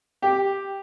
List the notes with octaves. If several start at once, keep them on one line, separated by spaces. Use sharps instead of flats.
G4